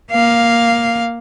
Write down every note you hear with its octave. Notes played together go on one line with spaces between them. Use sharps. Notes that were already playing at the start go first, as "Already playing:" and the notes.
A#3 F5